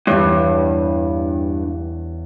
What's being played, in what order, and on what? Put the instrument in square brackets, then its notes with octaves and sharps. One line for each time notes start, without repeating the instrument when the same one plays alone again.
[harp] E2 E3 C#5 [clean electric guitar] G2